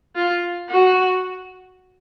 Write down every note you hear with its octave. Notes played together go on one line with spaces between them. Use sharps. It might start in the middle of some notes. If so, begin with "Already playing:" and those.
F4
F#4